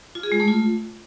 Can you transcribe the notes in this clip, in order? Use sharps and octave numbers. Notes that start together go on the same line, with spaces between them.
F4
G#4
G#3
A3
F4